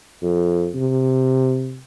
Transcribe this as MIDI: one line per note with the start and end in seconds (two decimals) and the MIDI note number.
0.23 0.70 41
0.75 1.82 48